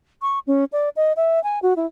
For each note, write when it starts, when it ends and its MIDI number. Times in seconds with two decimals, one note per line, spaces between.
0.22 0.39 85
0.47 0.64 61
0.72 0.89 74
0.96 1.13 75
1.16 1.42 76
1.43 1.59 80
1.62 1.74 66
1.76 1.86 64